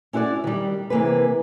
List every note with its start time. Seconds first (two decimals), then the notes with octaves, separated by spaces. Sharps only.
0.13 C#4 E4 F#4 C5 D5
0.44 D#3 G3
0.90 C3 E3 A#3 G#4 B4